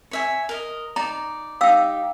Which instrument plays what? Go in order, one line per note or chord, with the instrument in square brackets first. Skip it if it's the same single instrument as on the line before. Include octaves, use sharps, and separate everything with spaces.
[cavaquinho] C#5 E5 G#5
A#4 D#5
[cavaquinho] D#4 D5 [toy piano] A#5
[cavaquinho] D#4 G4 [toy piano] F5 E6